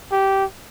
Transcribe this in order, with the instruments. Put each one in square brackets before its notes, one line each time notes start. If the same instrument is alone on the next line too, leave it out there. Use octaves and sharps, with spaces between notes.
[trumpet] G4